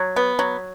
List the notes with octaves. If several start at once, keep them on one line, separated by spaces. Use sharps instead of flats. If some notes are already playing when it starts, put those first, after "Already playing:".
Already playing: F#3
B3
F#3